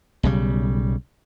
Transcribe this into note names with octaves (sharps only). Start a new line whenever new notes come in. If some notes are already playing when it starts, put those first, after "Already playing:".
B1 C#3 G3